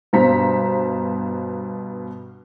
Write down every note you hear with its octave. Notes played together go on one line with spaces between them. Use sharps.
G2 B2 C5 A#5 B6